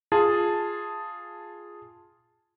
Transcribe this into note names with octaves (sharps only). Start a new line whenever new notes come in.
F4 G#4 A5